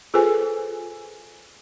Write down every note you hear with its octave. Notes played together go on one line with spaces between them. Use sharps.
F4 G#4 A4 B4 C5 G#5